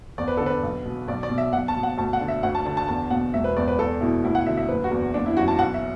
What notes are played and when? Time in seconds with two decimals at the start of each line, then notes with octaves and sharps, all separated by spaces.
0.18 E2 D5
0.28 B4
0.37 D3 A4
0.46 B4
0.63 B1
0.85 B2
1.08 B1 D5
1.23 D5
1.30 B2
1.38 E5
1.53 B1 F#5
1.68 A5
1.76 B2
1.83 F#5
1.98 D2 A5
2.13 F#5
2.21 D3
2.28 E5
2.43 D2 F#5
2.55 A5
2.65 D3 A5
2.77 A5
2.88 E2 A5
3.10 B2 F#5
3.34 E1 E5
3.44 B4
3.56 E2 D5
3.68 B4
3.79 E2 A4
4.01 B2 E4
4.24 D2 E4
4.35 F#5
4.46 D3 E5
4.57 E5
4.69 F#1 B4
4.84 F#4
4.91 E2
5.14 F#1 D4
5.26 E4
5.37 F#2 F#4
5.48 A5
5.59 B1 F#5
5.74 E5